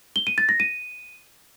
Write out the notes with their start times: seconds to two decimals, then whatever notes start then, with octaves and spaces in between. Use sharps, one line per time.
0.16 G7
0.27 D#7
0.38 A6
0.49 A#6
0.60 D#7